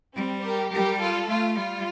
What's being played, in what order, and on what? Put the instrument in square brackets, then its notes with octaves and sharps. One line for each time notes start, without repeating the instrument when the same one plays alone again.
[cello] G3 [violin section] C4
[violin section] G4 A#4
[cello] G3 [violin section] G4 A#4
[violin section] F4 A4
[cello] A3 [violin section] F4
[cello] G3 [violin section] F4